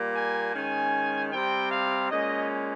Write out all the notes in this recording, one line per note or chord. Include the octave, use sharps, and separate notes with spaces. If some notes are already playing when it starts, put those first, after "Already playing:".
Already playing: A#2 G3 A#3
G#5
D#3 G#3 C#4 G#5
C3 G3 C4 G5
F5
A#2 G#3 C#4 D#5